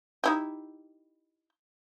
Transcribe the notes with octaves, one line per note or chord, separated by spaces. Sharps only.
D#4 E4 G4